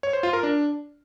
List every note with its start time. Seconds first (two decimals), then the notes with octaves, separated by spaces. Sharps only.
0.03 C#5
0.13 C5
0.23 F4
0.33 A#4
0.43 D4